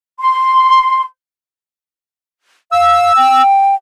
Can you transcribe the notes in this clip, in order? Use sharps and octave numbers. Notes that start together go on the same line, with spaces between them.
C6
F5 E6
G5